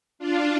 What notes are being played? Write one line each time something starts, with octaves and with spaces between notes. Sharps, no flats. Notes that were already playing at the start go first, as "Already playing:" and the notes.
D4 F4